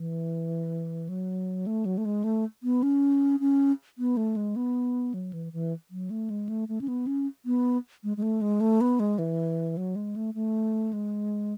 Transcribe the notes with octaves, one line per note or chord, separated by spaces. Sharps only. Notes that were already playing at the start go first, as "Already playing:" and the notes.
Already playing: E3
F#3
A3
F#3
A3
G#3
A3
B3
C#4
C#4
B3
A3
G#3
B3
F#3
E3
E3
F#3
A3
G#3
A3
A3
C#4
B3
C#4
B3
G#3
G#3
A3
G#3
A3
B3
G#3
E3
F#3
G#3
A3
A3
G#3